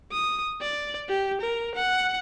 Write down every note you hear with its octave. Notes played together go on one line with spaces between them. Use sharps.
D#6
D5
G4
A#4
F#5